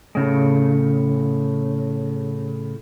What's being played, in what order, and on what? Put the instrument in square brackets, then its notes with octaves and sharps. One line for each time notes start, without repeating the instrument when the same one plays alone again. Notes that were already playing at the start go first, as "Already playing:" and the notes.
[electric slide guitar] A2 C#3 G#3